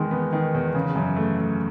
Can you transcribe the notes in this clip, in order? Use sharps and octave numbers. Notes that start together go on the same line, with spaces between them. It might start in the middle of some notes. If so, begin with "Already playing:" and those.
Already playing: E2 D#3 G#3
B3
D#3
E2
C#3
F#2
A3
A3